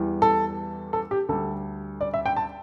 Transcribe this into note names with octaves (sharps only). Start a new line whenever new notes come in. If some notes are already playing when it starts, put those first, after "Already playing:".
Already playing: E2 E3 G3
A4
A4
G4
D2 D3 G3 A4
D5
E5
G5
A5